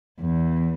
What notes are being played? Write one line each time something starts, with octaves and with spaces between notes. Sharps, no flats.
E2